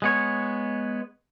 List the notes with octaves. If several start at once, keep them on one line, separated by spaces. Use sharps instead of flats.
G#3 B3 C#5